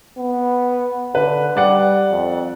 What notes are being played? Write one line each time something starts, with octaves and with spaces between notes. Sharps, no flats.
B3
D3 B4
G3 D5 F#5
F2